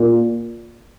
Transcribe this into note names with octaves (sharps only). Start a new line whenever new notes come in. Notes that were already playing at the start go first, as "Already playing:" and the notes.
Already playing: A#2